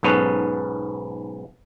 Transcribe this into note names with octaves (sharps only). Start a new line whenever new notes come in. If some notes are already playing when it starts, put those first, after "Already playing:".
B1 G#2 B3 C#4 A4 B4